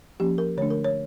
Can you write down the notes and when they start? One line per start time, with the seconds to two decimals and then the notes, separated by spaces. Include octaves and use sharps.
0.20 F3 A#3 C#4 G4
0.38 A#4
0.57 D3 A3 D4 C#5
0.70 A#4
0.84 C#5